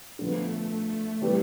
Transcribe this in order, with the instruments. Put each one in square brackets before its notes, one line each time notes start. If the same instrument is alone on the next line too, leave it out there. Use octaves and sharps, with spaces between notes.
[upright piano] D3 F3 B3 [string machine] A3
[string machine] A3
[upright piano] E3 G3 C4 G4 B4